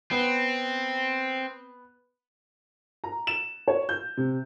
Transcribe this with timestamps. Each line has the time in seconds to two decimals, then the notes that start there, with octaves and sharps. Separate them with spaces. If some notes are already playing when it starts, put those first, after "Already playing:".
0.11 B3 C4
3.04 A#5
3.27 E7
3.68 C#5
3.89 G6
4.17 C3